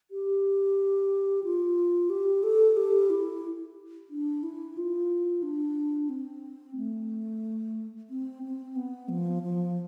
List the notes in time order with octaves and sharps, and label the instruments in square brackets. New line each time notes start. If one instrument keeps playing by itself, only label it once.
[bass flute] G4
F4
G4
A4
G4
E4
D4
E4
F4
D4
C4
A3
C4
C4
B3
F3
F3